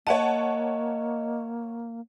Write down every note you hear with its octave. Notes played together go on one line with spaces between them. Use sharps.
A#3 C#5 D#5 F#5 A5